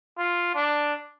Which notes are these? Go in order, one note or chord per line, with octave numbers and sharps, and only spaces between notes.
F4
D4